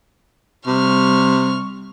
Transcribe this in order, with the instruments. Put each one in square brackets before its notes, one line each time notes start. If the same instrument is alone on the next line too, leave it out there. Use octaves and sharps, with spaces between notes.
[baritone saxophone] C3 [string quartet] G3 C#6 F6